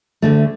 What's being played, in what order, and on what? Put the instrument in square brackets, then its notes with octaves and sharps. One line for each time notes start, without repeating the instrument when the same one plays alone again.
[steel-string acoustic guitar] D2 D3 A3